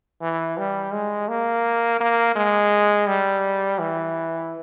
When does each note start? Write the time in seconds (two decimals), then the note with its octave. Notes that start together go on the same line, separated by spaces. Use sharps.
0.21 E3
0.58 G3
0.93 G#3
1.29 A#3
2.00 A#3
2.36 G#3
3.08 G3
3.79 E3